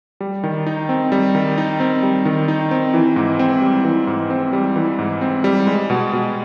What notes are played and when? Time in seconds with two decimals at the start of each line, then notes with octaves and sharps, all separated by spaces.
0.21 G3
0.44 D#3
0.66 D#4
0.89 C4
1.12 G3
1.35 D#3
1.58 D#4
1.80 C4
2.03 G3
2.25 D#3
2.48 D#4
2.71 C4
2.94 E3
3.16 G#2
3.39 C4
3.62 G3
3.85 E3
4.07 G#2
4.30 C4
4.53 G3
4.76 E3
4.99 G#2
5.21 C4
5.44 G3
5.67 G#3
5.90 B2
6.13 B2